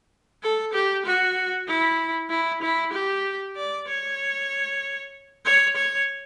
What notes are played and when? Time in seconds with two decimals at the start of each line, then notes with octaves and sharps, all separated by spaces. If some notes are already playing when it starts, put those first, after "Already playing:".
0.43 A4
0.74 G4
1.06 F#4
1.67 E4
2.30 E4
2.62 E4
2.93 G4
3.57 D5
3.88 C#5
5.45 C#5
5.76 C#5